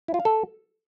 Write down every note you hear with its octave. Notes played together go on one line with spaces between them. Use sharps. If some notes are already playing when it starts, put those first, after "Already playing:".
E4
F4
F5
A4